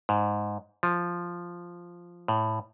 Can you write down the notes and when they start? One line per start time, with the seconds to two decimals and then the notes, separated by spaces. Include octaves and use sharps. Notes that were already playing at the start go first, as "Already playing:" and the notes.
0.09 G#2
0.83 F3
2.28 A2